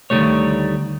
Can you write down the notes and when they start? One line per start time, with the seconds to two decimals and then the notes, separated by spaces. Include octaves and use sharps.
0.10 D2 D#3 F#3 G3 A3 C#5